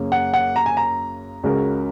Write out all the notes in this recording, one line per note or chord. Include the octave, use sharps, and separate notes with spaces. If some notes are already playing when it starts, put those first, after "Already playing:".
Already playing: F#2 C#3 A#3 C#4
F#5
F#5
A#5
G#5
A#5
C#2 C#3 G#3 F#4 A#4